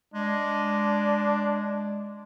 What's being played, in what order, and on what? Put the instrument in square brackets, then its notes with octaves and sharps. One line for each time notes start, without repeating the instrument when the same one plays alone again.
[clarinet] G#3 [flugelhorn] D4